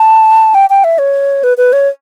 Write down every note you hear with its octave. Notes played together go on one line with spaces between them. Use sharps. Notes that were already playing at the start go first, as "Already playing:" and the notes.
Already playing: A5
G5
G5
E5
C#5
B4
B4
C#5